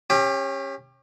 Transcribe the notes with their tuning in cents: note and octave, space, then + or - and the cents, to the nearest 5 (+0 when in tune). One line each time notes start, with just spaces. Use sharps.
C#4 -20 G4 +25